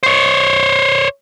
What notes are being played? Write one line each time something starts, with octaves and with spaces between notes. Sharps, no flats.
C5 C#5